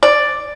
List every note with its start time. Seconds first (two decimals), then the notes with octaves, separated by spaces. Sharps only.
0.03 D5